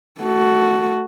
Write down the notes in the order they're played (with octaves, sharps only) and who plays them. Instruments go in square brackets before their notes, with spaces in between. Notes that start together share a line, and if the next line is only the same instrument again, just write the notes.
[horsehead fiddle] A3 F#4